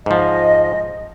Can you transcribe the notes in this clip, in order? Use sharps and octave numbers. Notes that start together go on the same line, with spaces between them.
G#2 F3 D#5